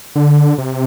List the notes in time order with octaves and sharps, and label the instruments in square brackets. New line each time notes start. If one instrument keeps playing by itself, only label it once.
[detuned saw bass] D3
C3